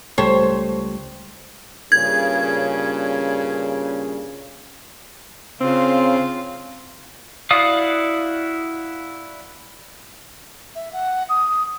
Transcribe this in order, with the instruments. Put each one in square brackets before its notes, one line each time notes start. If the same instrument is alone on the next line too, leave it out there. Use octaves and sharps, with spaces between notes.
[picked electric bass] C#2 G3 A3 [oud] C5 C#5
[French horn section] G2 A#2 C#3 [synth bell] G#6
[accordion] C#3 [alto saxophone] C4 [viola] F4
[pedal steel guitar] E4 F#4 D5 F5 D#6
[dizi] E5
F#5
D#6